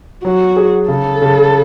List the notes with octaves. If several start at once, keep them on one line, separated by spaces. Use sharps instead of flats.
F#3 F#4
G#4
C#3 A4
C#3